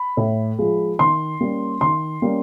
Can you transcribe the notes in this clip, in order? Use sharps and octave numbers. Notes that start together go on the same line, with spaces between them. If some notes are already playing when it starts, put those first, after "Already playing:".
Already playing: B5
A2
F3 G#3
D#3 C6
G3 A#3 C#4
D#3 C6
G3 A#3 C#4